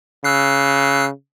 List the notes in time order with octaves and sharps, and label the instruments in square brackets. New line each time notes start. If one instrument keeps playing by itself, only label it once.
[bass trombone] C#3 [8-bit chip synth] E6 F#6 C7